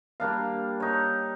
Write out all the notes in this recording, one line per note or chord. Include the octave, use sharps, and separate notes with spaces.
G3 A#3 D4 F5
D#4 C#5